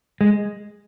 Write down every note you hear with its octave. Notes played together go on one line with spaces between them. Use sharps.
G#3